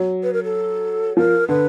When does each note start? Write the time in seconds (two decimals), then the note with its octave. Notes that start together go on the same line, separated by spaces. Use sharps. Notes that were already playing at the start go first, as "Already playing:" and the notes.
Already playing: F#3
0.23 B4
0.33 A#4
0.44 A4
1.17 F3 A#4
1.48 D3 B4